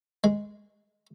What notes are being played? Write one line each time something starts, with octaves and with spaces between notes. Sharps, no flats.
G#3